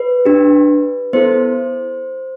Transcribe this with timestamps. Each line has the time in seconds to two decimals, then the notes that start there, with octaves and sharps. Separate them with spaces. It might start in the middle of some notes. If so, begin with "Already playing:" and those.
Already playing: B4
0.25 D4 G4
1.13 B3 E4 A4 C5